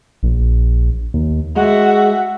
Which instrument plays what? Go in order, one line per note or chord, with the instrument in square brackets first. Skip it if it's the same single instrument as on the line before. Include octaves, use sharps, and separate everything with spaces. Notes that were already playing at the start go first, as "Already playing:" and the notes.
[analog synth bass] A#1
D#2
[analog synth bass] G#3 [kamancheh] F#4 E5